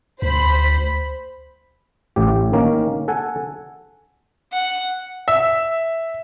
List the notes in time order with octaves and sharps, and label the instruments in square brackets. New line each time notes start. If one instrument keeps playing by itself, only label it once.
[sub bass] D2 [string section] C5 B5
[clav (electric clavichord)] A1 A2 G4
D#3 A#3 C#4
A4 F#5 G#5
[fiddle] F#5
[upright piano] E5